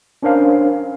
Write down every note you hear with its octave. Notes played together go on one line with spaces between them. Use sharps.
C#4 D4 A#4 C5 F5